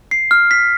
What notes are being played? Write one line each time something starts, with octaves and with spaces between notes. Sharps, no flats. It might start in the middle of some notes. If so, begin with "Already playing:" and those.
C7
F6
B6